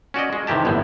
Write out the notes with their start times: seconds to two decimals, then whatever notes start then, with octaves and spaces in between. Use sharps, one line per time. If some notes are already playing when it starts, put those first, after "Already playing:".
0.14 C#4 F#4 D5 D#5
0.33 G#3
0.47 C3 D#3 E3 G4 A5
0.65 G1 A2 D3 E3